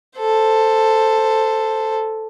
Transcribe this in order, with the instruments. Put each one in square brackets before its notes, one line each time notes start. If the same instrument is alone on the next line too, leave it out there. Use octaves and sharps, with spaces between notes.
[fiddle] A4 C5